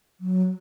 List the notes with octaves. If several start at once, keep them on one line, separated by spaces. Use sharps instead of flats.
F#3